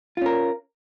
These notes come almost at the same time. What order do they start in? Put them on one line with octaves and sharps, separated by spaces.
F4 C#4 A#4